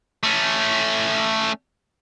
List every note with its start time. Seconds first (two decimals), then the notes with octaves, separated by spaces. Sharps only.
0.24 A3 C#4